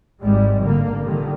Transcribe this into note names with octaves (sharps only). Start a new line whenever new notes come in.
G#1 G3 G#3
D3 A#3
A#2 D3 D#3 G3